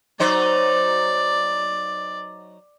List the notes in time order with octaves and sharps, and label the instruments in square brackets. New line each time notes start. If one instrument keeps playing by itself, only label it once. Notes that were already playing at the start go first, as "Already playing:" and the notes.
[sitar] F#3 D#4 C5 [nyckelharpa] D5